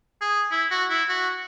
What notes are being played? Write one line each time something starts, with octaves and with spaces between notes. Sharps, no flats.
G#4
E4
F#4
E4
F#4